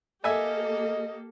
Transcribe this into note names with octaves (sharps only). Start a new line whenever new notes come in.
A#3 G4 A4 D#5 E5 G#5